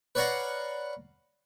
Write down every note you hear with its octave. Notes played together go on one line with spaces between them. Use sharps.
B4 C#5 D5 F5 F#5 A#5